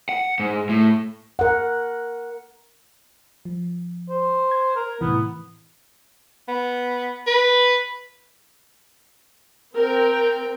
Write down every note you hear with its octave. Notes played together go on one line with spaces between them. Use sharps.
F#5
G#2
A2
A#4 F#5
F3
C5
G#6
A#4
A2 C3 E3 B3
B3
B4
C4 A#4 G5